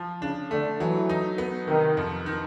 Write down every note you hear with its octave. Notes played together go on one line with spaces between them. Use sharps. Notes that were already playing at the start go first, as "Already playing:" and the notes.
Already playing: F3
C#3 D4
D3 A3
E3 F#3
D#4
B3
C3 D#3
F2
D#3